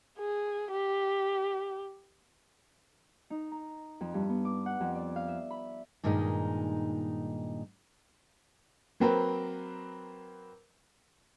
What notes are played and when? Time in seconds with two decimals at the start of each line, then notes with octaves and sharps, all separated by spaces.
0.19 G#4
0.71 G4
3.30 D#4
3.52 A#5
4.01 F2
4.14 G2
4.29 B3
4.45 D6
4.66 F#5
4.81 F2
4.95 D5
5.16 F5
5.28 E5
5.51 B5
6.04 G2 A#2 D#3 G#3 D4 D#4
9.00 F#3 A#3 C4 A#4 B4